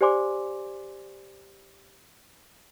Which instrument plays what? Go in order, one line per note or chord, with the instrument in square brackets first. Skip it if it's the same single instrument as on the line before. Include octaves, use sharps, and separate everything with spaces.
[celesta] G4 C5 D5 G#5 C6 D6